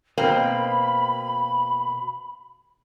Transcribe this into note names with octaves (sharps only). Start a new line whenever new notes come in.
B2 A#3 C4 B5